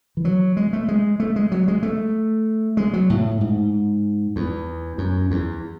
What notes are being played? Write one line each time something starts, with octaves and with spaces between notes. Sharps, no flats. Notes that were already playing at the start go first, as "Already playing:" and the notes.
E3
F#3
G#3
A3
G#3
A3
G#3
F#3
G#3
A3
G#3
F#3
A2
G#2
E2
F#2
E2